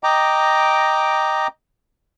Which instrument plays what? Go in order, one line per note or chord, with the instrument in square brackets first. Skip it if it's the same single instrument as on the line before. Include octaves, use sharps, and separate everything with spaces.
[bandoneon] D#5 G5 A#5 D6